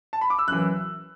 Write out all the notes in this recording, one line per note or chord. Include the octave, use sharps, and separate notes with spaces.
A5
B5
D6
E6
F#1 F#2 E3 F#6